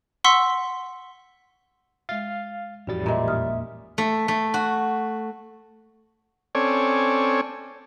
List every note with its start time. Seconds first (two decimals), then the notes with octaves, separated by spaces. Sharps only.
0.24 F#5 C6 C#6 E6 B6
2.09 G#3 E5 F5 A6
2.87 A1 F2 F3 G3 F#4 A6
3.06 A#2 G#3 E5
3.28 E2 D#6 F6
3.98 A3
4.28 A3
4.54 F#4
6.55 C4 C#4 A4 C#5 D5 G#5